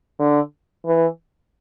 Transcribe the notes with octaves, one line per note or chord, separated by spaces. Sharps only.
D3
E3